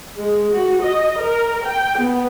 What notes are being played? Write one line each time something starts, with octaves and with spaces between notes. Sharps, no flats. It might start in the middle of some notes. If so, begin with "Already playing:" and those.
G#3
F#4
D#5
A#4
G5
B3